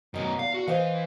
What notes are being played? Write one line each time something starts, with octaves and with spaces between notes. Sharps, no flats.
F#2 B2 D#3 D#4
E2 F5
F#4
E3 C5 D#5 F5